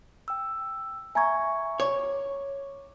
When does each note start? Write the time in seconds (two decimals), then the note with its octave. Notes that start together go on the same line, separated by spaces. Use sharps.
0.28 G5 E6
1.15 E5 G#5 A#5 C#6 G#6
1.80 C#5 D6